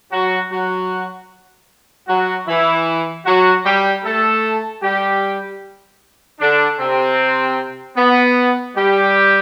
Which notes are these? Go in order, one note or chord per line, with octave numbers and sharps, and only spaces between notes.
F#3 F#4
F#3 F#4
F#3 F#4
E3 E4
F#3 F#4
G3 G4
A3 A4
G3 G4
D3 D4
C3 C4
B3
G3 G4